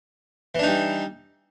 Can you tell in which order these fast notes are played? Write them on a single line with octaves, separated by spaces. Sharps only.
E3 D4 D#4 G3